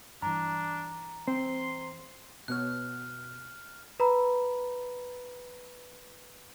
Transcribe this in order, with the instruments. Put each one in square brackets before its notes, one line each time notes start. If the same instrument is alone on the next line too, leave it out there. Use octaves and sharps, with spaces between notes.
[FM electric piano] G2 E3 [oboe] D4 [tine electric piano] A#5
[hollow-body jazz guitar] C4 [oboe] C6
[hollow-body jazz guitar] B2 B3 C#5 [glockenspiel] F6 F#6
[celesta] B4 A#5 B5